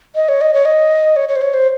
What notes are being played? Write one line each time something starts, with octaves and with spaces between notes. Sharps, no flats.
D#5
C#5
D#5
C#5
D#5
C#5
C#5
C5
C#5
C5